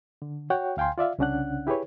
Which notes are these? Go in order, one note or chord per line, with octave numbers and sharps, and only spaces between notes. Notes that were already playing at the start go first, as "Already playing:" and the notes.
D3
F#4 C#5 F#5 G5
D2 F5 G5 G#5 C6
F4 D5 E5 F5
C2 C#3 C#4 D4 F#5 F#6
E4 G4 G#4 B4 C#5